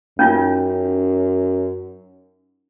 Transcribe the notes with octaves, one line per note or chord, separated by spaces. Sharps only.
F#2 C#4 D#4 F4